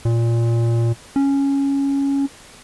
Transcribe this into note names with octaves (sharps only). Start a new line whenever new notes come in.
A#2
C#4